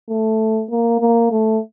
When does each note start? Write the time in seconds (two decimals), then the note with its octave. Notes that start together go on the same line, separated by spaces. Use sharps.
0.09 A3
0.70 A#3
1.00 A#3
1.31 A3